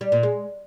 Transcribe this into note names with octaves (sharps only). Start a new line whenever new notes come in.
G3
A#2
G#3